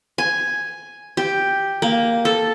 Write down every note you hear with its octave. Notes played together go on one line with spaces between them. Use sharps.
G#5
G4
A#3
A4